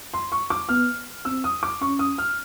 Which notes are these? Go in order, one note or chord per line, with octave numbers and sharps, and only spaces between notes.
C6
C#6
D6
B3 F6
C4 E6
D#6
D6
C#4 C#6
D#6
F6